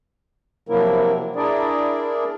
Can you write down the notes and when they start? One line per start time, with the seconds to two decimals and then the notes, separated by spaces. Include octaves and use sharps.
0.69 C3 F3 F#3 A#3 E4 A#4
1.36 D4 E4 G#4 A#4 D5